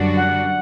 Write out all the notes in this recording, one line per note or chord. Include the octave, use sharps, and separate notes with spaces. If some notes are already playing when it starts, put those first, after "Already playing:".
Already playing: F#2 D3 G3 D4 F#4
F#5